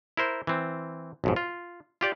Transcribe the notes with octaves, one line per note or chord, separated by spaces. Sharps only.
E4 A#4 C5
E3 C4
B1 F2 G#2
F4
F4 G4 D5